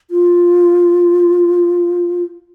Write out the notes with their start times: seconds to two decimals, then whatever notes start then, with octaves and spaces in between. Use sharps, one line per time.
0.11 F4